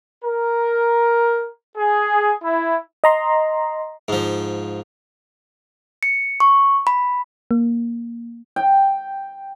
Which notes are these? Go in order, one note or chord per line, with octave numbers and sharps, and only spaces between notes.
A#4
G#4
E4
D#5 A#5 C6
G#2 F3
C#7
C#6
B5
A#3
G5